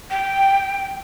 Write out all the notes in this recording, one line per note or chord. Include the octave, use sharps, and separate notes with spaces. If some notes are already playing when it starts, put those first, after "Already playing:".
G5